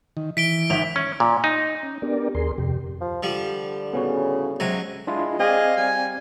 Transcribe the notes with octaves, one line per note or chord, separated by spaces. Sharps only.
D#3
E3 B6 D7 G7
G#1 E5 F7
C#4
A#2
D#4
C#4
B3 D4 G4 A#4 D5
D#2 G#4 A#4 C6
F2 C3 G4
F3
D3 F3 G3
A2 C#3 B3 C#4 F#4
C#2 C3 F#3 G#5
G#3 D4 E4 F4
C4 G#4 D5 D#5 F5
G3 G#5